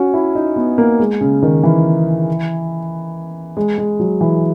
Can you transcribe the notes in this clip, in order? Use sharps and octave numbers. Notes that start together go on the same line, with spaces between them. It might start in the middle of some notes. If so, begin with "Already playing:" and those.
Already playing: C#4 F#4
E4
D#4
B3
A#3
G#3
C#3
D#3
E3
G#3
G#3
F#3
E3